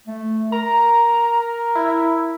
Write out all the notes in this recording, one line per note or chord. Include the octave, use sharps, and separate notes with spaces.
A3
A#4 A#5
E4